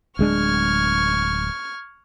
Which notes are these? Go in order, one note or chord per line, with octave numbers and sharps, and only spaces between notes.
D1 G#3 D4 C#6 F6 G#6